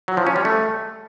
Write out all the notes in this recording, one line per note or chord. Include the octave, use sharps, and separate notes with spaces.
F#3
F3
C#4
G3
A3